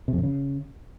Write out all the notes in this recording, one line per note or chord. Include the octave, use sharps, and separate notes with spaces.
C3
F2
C3
C#3